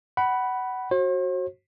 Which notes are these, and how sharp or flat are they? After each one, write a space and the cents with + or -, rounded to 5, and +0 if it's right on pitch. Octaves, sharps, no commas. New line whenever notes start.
F#5 +20 B5 -5
F#4 +0 C5 +45